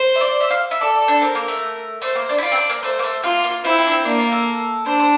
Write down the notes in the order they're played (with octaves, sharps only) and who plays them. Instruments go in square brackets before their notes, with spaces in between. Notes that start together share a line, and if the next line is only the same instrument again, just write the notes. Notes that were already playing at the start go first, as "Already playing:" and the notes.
Already playing: [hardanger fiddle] C5
[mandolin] E5
D5
E5
F5
E5
[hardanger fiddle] A4 [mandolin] D5
[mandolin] D4
[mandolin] C4 [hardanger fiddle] A#4
[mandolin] A#3
A3
[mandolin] A3 [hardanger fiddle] C5
[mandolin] A#3
D4
E4
[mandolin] F4 [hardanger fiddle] D5
[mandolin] C4
D4
A#3
[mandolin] A3 [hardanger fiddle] C5
[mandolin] A#3
A3
[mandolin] A#3 [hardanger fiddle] F4
[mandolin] A#3
[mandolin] C4 [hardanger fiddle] E4
[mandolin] C4
D4
C4
[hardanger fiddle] A#3 [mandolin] D4
[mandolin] F4
A4
[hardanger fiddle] D4 [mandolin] C5
[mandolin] C5